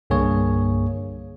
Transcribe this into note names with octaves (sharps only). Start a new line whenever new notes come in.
C2 G2 D3 A#3 G#4 C#5